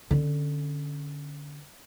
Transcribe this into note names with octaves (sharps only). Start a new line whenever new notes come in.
D3 C#4